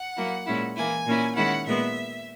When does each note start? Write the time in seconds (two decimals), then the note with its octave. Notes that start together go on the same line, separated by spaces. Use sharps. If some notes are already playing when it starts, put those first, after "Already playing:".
Already playing: F#5
0.16 F#3 A#3 E4
0.46 A#2 G#3 C#4 E4
0.76 E3 A#3 E4 G#5
1.06 A#2 A#3 C#4 E4
1.36 D#3 G#3 C#4 E4 F#5
1.67 A#2 G#3 B3 E5